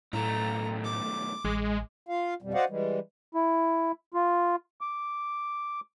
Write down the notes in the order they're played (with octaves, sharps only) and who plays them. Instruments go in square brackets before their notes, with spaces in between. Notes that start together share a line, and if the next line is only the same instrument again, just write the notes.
[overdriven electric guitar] B1 A3 [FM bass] A2 [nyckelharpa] A#5
[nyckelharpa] D6
[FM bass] A1 [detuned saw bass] G#3
[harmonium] F4 F5
F2 B2 G3
F#4 C5 D5 D#5 F5 F#5
E3 G3 G#3
[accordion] E4
F4
D6